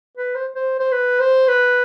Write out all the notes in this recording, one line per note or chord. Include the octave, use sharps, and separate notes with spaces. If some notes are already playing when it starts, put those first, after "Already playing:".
B4
C5
C5
C5
B4
C5
B4